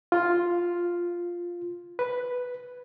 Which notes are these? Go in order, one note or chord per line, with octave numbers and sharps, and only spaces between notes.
F4
B4